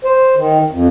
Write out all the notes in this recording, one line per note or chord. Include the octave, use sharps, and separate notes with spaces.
C5
D#3
F2